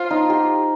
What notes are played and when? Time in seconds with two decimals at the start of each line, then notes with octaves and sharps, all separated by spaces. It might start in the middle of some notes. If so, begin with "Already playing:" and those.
Already playing: F4 C5
0.10 D#4
0.30 G4